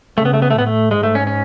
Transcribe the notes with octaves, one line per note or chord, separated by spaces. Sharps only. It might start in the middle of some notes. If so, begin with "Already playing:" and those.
C#3 A3
B3
A3
B3
A3
A2 B3
A3
G#2 G#3
A3
C#4
C#4